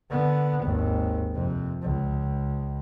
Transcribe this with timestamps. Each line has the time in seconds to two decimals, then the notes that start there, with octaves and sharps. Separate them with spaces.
0.10 D3 B3
0.62 G#1 D#2
1.35 F2 C3
1.82 C#2